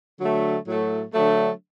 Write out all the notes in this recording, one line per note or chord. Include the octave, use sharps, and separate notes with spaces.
D3 F#3 A3
A2 F#3 A3
D3 F#3 A3